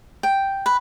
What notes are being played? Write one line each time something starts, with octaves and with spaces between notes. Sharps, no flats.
G5
B4